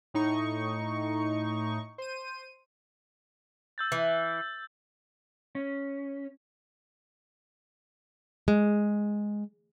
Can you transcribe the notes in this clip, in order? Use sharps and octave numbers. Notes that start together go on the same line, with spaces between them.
A2 D#4 C#6
C5 D#7
E6 G6 A6
E3
C#4
G#3